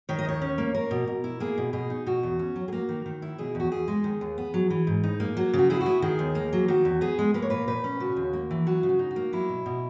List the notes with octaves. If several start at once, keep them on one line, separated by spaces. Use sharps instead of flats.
D#3 C#5
D#5
D#2 C#5
C#4
A#3
A#3 A#4
B2
B2
E4
A#3 G#4
B2
B2 G#4
D#4
B2 F#4
E2
C#4
F#3
G#4
A#3 F#4
D#3
D#3
E4
B2 G#4
E2 F#4
E2 G#4
G#3
D#3
D#2
B3
F#3
E3
G#2
D#4
A#3
F#3 F#4
C#3
F#4
E4 G#4
F#4
B3
D#3 G#4
D#2
A#3
F#3
D#3 F#4
E2
B3 G#4
G#3
A#3 B4
C#5
A#2 B4
A#2 B4
C#4
C#3 F#4
D#2
A#3
E3
F#3 F#4
C#3
F#4
D#4
F#4
A#3
F#3 E4
B2
B2